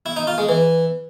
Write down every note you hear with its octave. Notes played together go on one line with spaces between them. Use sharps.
E4
D#4
F4
G#3
E3